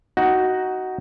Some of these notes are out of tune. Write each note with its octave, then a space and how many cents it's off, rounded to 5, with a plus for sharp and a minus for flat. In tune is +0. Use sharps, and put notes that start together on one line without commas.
D#4 +10 F#4 +10